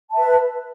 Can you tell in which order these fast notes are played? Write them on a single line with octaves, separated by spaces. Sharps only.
A5 E5 B4